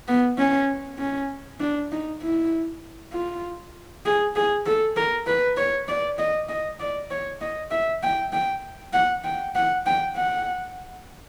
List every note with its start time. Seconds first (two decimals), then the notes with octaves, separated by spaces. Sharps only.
0.08 B3
0.38 C#4
0.99 C#4
1.60 D4
1.92 D#4
2.22 E4
3.13 F4
4.05 G#4
4.36 G#4
4.66 A4
4.96 A#4
5.27 B4
5.57 C#5
5.88 D5
6.18 D#5
6.49 D#5
6.80 D5
7.11 C#5
7.41 D#5
7.71 E5
8.03 G5
8.33 G5
8.93 F#5
9.24 G5
9.55 F#5
9.86 G5
10.16 F#5